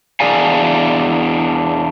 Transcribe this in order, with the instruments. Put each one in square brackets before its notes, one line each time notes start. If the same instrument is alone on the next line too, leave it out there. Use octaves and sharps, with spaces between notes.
[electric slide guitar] E2 D4 G#4 D5 F5 G#5